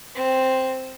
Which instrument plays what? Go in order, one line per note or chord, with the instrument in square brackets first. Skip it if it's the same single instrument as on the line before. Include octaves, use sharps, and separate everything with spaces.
[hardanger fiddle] C4